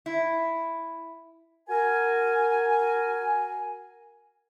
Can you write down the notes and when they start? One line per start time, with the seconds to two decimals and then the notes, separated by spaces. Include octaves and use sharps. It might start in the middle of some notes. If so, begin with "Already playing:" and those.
0.06 E4
1.69 F#4 A#4 G#5